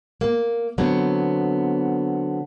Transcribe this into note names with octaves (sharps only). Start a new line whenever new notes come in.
A#3
D3 F#3 B3 C4